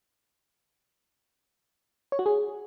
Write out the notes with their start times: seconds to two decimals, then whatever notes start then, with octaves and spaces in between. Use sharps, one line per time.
2.12 C#5
2.19 F#4
2.26 G#4